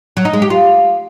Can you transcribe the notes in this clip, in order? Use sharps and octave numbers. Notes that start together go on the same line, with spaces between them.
F#3
D#4
G#3
G4
F4